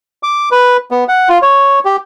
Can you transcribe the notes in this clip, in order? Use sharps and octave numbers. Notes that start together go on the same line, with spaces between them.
D6
B4
B3
F#5
F4
C#5
G4